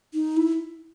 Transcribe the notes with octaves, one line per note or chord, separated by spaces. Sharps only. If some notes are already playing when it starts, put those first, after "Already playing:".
D#4
E4